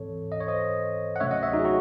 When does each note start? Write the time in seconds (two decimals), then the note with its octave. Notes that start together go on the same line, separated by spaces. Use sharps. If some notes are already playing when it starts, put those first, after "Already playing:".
Already playing: G#2 E3 C4 A4 C#5
0.32 D#5
0.40 C#5
0.48 C5 D#5
1.16 F#5
1.20 C3 F#3 A3 C#4 C#5 E5
1.31 D#5 F#5
1.43 C#5 E5
1.53 D#4 F#4
1.59 G#4
1.64 D#4 F#4